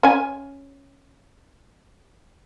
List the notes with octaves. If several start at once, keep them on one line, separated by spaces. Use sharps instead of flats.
C#4 G#5